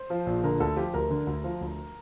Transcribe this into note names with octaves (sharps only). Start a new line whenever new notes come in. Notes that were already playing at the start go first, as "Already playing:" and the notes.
Already playing: C5
F3
A#1
D3 A#4
D2 A4
F3 G4
D2 A#4
D3
D2
F3
D2